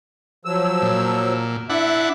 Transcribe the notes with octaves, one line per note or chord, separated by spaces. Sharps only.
F3 F#3 E6
A#2
D4 E4 E5 F#5